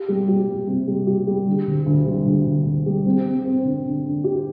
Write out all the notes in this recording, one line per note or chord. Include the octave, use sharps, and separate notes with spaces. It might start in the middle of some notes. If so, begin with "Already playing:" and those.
Already playing: G4
G3
G4
G3
C3
G3
G4
G3
D3
D2
D2
G3
D2
D2
D2
G3
C4
C4
C4
D3
D3
D3
G4